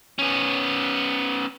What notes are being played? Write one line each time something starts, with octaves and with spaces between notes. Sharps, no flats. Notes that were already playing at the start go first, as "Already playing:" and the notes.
B3 C#4